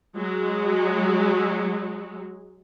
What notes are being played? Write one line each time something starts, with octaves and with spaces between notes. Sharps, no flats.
F#3 G#3